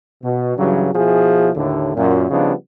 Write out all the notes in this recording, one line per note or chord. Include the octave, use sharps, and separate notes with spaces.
B2
G2 C#3 E3 F#3
B2 F3 E4 G#4
D#2 A2 D3
F#2 A#2
C#3 F3 G3 B3 D4 D#4